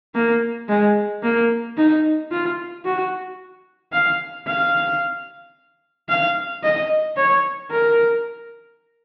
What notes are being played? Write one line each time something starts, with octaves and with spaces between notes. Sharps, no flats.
A#3
G#3
A#3
D#4
F4
F#4
F5
F5
F5
D#5
C#5
A#4